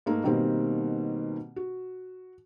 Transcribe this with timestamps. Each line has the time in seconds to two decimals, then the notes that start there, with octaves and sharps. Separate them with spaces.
0.06 G#2 A3 A#3
0.23 B2 D#3 G3 A#3 C4
1.56 F#4